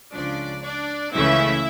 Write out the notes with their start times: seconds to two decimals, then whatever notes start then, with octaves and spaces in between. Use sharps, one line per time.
0.13 C#2 C#3 F3 D4 D5
0.63 D4 D5
1.12 C#2 C#3 E3 A3 C#4 E4 E5